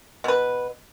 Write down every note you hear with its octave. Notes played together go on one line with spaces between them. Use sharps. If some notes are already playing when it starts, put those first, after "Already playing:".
B2 B4